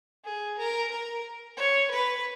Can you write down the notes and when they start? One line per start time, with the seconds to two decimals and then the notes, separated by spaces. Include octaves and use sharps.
0.25 G#4
0.59 A#4
0.92 A#4
1.57 C#5
1.91 B4